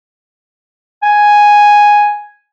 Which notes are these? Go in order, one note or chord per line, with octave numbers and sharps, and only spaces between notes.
G#5